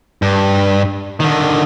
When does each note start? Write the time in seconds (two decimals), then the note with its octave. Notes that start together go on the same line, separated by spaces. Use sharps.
0.22 G2
1.20 D3 D#3